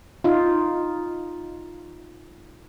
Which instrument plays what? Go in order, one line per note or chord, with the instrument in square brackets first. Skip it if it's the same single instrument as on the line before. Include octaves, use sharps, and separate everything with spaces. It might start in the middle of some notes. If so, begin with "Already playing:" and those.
[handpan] D#4 F4